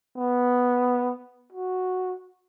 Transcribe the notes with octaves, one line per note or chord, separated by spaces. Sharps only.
B3
F#4